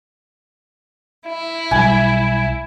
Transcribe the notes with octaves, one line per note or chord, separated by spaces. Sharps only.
E4
B1 G3 G#5